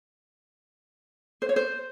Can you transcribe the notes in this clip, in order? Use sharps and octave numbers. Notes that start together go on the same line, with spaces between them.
C5
C#5
C5